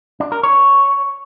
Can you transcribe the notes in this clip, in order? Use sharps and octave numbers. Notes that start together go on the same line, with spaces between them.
D4
A#4
C#5